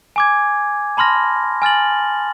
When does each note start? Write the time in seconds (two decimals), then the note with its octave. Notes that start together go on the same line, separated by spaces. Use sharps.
0.16 G#5 D6 G#6
0.97 A5 B5 C6 F6 A#6
1.62 G#5 F6 A6 F#7